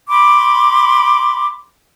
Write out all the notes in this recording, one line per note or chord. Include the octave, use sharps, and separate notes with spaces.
B5 C6 D6